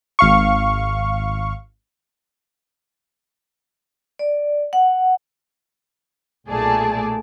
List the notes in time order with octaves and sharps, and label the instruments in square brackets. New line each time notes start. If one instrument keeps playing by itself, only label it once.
[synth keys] G#1 F5 C#6
[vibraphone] D5
F#5
[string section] B1 A#2 A3 G#4 D5 A5